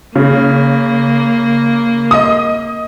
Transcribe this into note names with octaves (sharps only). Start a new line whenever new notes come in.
C#3 A#3
D#5 D#6